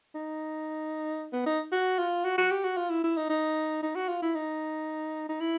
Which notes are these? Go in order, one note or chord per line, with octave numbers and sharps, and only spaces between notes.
D#4
B3
D#4
F#4
F4
F#4
F#4
G4
F#4
F4
E4
E4
D#4
D#4
D#4
F#4
F4
E4
D#4
D#4
E4